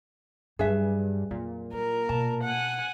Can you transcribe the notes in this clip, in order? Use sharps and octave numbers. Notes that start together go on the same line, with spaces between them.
G2 F#3 G3 G#4 B4 E5
F2 A#2 F#3
F#3 A#4
B2 A5
F#5 G#5